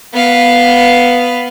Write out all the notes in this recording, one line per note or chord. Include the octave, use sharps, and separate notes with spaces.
B3 F5